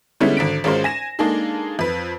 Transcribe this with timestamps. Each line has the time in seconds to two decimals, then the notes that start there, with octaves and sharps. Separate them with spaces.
0.20 D3 G3 G#3 B3 C#4 E4
0.37 G#1 D3 B6 D7
0.64 G#1 G#3 C#4 F4 A#4 C5
0.84 G#5 A#6 E7
1.19 G#3 A#3 D4 D#4 G#4 A4
1.79 F2 B4